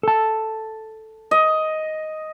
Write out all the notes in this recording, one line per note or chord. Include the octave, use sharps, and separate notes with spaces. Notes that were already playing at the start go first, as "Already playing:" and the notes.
A4 A5
D#5